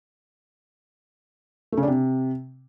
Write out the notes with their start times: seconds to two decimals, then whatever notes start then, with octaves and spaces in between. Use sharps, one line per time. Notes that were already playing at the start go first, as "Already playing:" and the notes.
1.72 A3
1.78 C#3
1.83 D4
1.88 C3